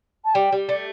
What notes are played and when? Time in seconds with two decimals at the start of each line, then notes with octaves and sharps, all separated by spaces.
0.25 A5
0.34 G3 G5
0.52 G3
0.68 A3 D5